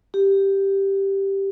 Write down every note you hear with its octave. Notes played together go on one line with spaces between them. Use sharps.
G4